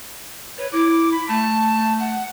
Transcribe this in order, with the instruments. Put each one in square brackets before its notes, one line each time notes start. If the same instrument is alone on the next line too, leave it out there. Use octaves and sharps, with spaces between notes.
[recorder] B4 [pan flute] C#5
[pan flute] E4 [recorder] D6
[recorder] B5
[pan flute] A3 [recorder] A5
[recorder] F#5